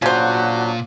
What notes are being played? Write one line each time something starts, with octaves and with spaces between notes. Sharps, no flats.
A#2 C#3 F#3 D4 F4 F#4 C5